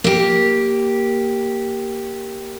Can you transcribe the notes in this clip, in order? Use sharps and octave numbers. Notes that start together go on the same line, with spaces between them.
A#3 G4